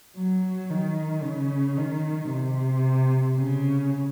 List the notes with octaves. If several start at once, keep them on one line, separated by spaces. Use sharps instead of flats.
F#3
D#3
C#3
D#3
C3
C#3